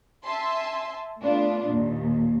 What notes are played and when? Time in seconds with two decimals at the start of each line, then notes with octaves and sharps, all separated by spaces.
0.23 E5 G#5 A5 C6
1.19 A3 B3 D4 F4
1.67 D#2 A#2